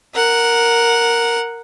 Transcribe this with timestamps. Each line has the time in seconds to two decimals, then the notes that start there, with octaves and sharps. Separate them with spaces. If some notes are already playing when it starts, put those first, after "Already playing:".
0.15 A#4 F#5